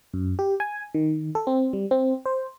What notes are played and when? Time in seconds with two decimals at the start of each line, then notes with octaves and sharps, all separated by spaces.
0.14 F#2
0.39 G4
0.60 G#5
0.94 D#3
1.35 A4
1.47 C4
1.73 G3
1.91 C4
2.26 C5